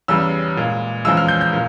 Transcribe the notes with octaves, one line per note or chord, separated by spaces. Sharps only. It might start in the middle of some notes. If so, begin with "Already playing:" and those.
E2 C#3 G3 E6
A#2 G#3
E2 C#3 F3 G#3 E6
F6
G6
G6
A#2